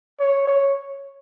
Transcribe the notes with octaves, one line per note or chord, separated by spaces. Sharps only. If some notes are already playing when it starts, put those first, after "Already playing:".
C#5
C#5